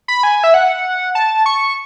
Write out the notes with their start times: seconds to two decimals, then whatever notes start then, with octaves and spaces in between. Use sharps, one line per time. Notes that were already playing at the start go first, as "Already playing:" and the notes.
0.08 B5
0.23 G#5
0.44 E5
0.54 F#5
1.15 A5
1.46 C#6